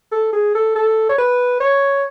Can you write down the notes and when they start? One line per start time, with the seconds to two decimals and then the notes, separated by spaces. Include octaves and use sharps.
0.12 A4
0.33 G#4
0.55 A4
0.75 A4
1.09 C#5
1.18 B4
1.60 C#5